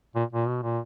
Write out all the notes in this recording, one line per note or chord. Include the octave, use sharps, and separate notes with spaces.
A#2
A#2
B2
A#2